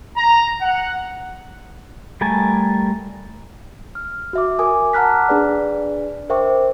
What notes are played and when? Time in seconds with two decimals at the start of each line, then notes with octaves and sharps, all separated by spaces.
0.16 A#5
0.59 F#5
2.21 G3 A3 A#4 G#5 A5
3.95 F6
4.33 F#4 E5 D6
4.59 A#4 G#5 D6 D#6
4.93 F#5 A5 A#5 F6 F#6 B6
5.29 D4 G#4 B4 D5
6.29 A#4 C5 E5 G5 C#6 D6